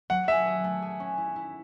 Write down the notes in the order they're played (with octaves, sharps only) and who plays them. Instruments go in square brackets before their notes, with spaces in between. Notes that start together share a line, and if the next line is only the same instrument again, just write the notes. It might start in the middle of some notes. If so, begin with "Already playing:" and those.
[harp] F#3 [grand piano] F#5
[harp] G#4 [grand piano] E5
[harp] G#4
A3
G#4
C#4
E4
E4